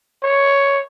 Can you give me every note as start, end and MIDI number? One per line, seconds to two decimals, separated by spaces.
0.23 0.82 73